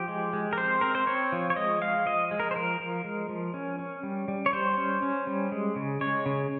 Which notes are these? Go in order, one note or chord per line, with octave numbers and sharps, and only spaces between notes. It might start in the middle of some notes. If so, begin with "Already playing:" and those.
Already playing: F3 G4
G#3
G#3
A#4
C4 C5
C4 A#4
C5
C4 C#5
F3
C#5
G#3 D#5
G#3 F5
F3 D#5
G#3
A#4
C5
F3 A#4
F3
G#3
F3
C#4
C#4
G3
G3
C#5
G3 C5
C#4
C#4
G3
G#3
C#3
G#3 C#5
C#3